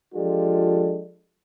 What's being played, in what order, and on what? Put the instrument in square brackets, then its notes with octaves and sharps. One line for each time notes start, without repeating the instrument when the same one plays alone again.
[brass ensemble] F3 G#3 D4 F4 G4 A4